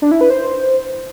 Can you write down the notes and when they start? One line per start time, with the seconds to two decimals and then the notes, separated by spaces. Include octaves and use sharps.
0.02 D4
0.11 E4
0.21 B4
0.30 C5